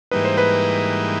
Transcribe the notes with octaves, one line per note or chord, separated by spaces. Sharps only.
G#2 E3 G3 A#3 D#4 B4
C5
B4